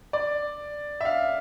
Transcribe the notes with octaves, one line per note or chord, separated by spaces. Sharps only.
D5
E5
F5